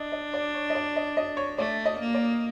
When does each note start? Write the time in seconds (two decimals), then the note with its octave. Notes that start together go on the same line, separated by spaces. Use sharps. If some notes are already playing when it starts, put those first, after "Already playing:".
Already playing: D4 D#5
0.12 D#5
0.34 D5
0.55 C#5
0.70 D#5
0.75 D5
0.96 D#5
1.17 D#5
1.37 C#5
1.58 A3 D5
1.85 D#5
2.00 A#3
2.14 D5